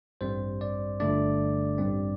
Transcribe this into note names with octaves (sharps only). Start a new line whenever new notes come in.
A1 G2 G3 C4 C5
D5
G1 G2 D3 A3 D4 D5
A1 G2 G3 C4